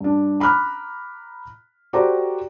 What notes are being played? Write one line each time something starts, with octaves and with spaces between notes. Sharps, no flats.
G2 D4
A#5 B5 D6 F6 F#6
F#4 G4 A4 C5 D5 A#5